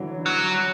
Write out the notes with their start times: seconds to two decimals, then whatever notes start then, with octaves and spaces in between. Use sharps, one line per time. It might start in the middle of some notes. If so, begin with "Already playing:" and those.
Already playing: D3 E3 F#3
0.26 F#3